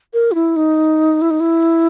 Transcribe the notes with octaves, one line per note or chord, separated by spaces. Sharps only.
A#4
F4
E4
D#4
E4
D#4
E4